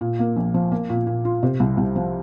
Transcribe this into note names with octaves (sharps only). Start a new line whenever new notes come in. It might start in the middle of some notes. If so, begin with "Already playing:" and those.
A#2
A#3
A#1
F3
A#3
A#2
A#2
F4
C3
C2
C2
F3